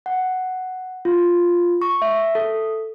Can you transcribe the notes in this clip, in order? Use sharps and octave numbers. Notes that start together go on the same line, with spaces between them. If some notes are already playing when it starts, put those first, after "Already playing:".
F#5
F4
C#6
E5
A4